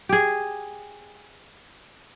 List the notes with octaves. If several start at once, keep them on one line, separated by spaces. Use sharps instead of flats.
G4 G#4